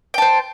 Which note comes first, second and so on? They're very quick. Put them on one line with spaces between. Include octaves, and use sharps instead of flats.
G5 A5 C5